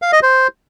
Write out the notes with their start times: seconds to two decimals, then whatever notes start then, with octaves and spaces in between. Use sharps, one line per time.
0.02 F5
0.12 D#5
0.23 C5